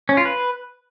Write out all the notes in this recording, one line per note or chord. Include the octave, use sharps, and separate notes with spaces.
C#4
F4
B4